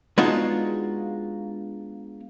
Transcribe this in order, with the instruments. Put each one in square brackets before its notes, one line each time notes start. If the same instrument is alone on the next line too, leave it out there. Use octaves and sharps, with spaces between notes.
[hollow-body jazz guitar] G#3 B3 D4 D#4 F4 F#4